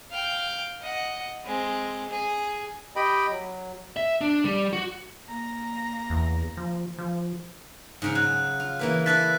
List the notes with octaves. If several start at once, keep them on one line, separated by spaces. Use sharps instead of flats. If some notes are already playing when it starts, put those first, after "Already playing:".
F5 G5
D#5 F#5
G#3 C4
G#4
G4 D#5 G5 B5
F#3
E5
D4
G3
F#4
A#3 A#5 A#6
E2
F3
F3
G#2 C#3 C#4
F#3 F#6
F4
E3 A#3 B4
E4 A4 B4 F#6 A6 B6